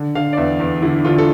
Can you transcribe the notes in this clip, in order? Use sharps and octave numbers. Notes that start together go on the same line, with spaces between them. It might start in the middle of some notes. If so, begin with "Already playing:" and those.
Already playing: D3
D3 F5
D5
E2 E5
E2
D3 E4
D3 F4
A4